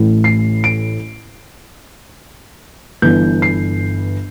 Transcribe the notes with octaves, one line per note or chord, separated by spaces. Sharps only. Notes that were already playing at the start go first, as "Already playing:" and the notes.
Already playing: A1 A2 E3
C7
D7
G1 G2 E3 G6
C7